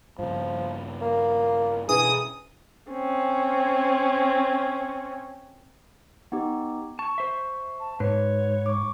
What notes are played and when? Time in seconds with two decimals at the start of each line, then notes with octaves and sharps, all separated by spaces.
0.19 G2 C#3 F3
1.01 A#3
1.89 B2 E3 C#4 D4 G#4 D#6
2.92 C4 C#4
6.32 B3 D#4 G4
6.99 A5 C#6
7.18 C5 E5
7.80 A5
8.00 G#2 B4 C#5
8.66 C#6 D6